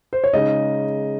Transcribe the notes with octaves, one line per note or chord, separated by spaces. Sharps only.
C5
C#5
C#3 G#3 D#4 D#5